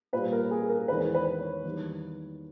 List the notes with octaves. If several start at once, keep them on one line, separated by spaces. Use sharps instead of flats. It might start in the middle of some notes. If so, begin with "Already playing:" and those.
A#2 G3 B4
A#4
G#4
A#4
E2 D#3 G#3 B4
B4
C#5
E2 D#3 G3